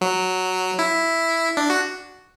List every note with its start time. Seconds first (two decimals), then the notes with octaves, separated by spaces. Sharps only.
0.01 F#3
0.79 E4
1.57 D4
1.70 F#4